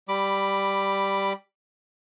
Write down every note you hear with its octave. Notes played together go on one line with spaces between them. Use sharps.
G3 B5 D6